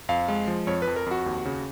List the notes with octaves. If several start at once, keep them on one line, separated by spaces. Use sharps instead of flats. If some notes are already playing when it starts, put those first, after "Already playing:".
F2 F5
G#3
F3
F2 C#5
B4
F2
A#4
F2 F#4
D#2
C#3